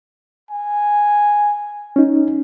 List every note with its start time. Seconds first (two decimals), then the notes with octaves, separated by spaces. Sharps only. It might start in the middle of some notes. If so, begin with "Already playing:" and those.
0.51 G#5
1.96 C#4 D#4